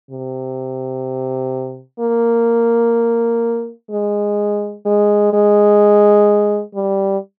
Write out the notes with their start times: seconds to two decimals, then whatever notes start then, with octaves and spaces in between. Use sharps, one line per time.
0.11 C3
2.00 A#3
3.91 G#3
4.86 G#3
5.33 G#3
6.75 G3